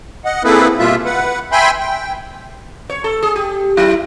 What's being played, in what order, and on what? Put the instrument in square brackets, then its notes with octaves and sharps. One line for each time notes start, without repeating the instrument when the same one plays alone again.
[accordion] D#5 F#5
A#3 C4 E4 G#4 A4 B4
B2 G3 A#3 F4 E5
B4 F#5
E5 G5 G#5 B5 C6
G5
[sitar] C#5
A4
G#4
G4
F#3 E4